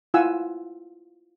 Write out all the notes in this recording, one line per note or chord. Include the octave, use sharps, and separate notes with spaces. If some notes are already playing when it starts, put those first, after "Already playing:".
E4 F4 F5 F#5 G#5 E6